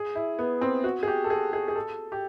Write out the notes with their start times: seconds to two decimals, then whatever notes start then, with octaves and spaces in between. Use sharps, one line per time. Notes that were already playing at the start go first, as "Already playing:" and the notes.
Already playing: G#4
0.15 E4
0.39 B3
0.61 C4
0.84 F#4
1.03 G#4
1.08 G4
1.24 A4
1.30 G#4
1.53 G#4
1.68 G#4
1.76 A4
2.12 G4